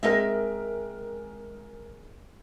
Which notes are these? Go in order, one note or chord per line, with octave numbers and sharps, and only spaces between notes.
G#3 C4 A#4 D#5 E5